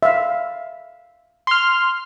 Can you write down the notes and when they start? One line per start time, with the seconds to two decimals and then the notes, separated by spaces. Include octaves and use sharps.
0.03 E5 F5
1.47 C6 F6